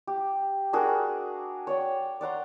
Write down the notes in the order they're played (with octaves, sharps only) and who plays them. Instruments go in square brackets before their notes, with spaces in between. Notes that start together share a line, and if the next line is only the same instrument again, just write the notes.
[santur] G4
D4 F#4 G#4 A#4
C#5 D5 G5
D5 F#5 A#5 C6